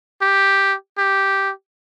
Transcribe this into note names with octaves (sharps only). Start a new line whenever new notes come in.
G4
G4